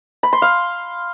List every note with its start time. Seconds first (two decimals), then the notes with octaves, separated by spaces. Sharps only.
0.23 B5
0.33 C6
0.42 F5